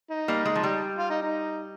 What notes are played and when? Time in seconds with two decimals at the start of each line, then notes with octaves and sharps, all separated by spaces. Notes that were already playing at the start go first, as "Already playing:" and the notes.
0.11 D#4
0.28 G3 A#3
0.45 G#3
0.55 F3
0.63 G3
0.99 F4
1.10 D#4
1.22 D#4